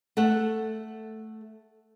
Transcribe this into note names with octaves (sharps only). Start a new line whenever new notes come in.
A3 A4 F#5